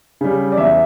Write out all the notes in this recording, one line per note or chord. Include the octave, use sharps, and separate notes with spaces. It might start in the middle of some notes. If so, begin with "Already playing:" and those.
C#3 G3
D5
E2 E5